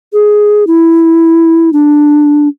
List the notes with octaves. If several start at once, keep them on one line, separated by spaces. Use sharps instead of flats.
G#4
E4
D4